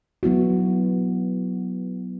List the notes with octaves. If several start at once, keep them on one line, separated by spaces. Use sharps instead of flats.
F#3 B3 E4 F#4